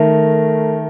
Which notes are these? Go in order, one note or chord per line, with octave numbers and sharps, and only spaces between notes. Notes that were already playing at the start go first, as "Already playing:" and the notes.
Already playing: D#3 A3 A#4